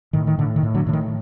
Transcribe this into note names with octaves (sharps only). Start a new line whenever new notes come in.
A2 D#3
D#3
A2 D3
D#3
A2
D3 F#3
A2 D3
D#3